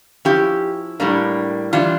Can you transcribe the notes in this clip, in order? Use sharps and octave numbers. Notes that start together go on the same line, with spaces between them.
F3 C#4 E4 G4
A2 G3 A#3 D4
E3 G3 D4 F4